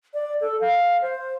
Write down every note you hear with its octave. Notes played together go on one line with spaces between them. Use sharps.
D5
A4
F5
C5